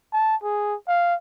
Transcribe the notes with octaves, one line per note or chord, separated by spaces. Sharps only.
A5
G#4
F5